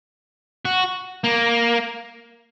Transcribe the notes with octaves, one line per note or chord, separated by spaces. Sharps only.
F#4
A#3